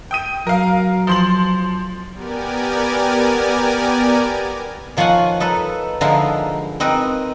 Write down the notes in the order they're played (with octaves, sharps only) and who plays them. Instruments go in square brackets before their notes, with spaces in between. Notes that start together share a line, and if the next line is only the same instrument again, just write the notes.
[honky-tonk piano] G5 D#6 D#7
[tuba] F#3 [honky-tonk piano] A#4 F5
[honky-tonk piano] F3 C6 F#7
[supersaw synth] B3 G4 A#4 D5 G#5
[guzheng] D#3 F3 F4 C#5 F#5 G#5
D#4 A4 B4
D3 F3 G#3 D#4 E4 A#4
C4 D#4 A#4 B4 G#5